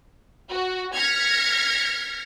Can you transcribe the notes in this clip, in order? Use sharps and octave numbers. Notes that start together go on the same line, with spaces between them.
F#4
F6 G#6 A#6 B6 C#7